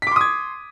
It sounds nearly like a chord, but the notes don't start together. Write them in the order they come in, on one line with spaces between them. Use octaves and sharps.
B6 D6 C6 D#6 G#6